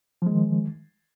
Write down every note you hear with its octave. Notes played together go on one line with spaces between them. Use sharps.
D#3 F3 G#3